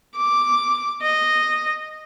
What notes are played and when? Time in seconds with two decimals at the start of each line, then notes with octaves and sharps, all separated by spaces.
0.16 D6
1.02 D#5